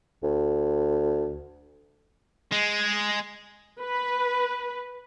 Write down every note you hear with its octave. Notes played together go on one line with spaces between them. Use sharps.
D2
G#3
B4